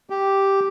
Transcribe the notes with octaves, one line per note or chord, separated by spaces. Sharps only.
G4